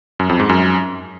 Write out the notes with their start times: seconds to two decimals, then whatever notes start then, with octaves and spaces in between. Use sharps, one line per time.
0.20 F#2
0.29 F2
0.39 G#2
0.49 F#2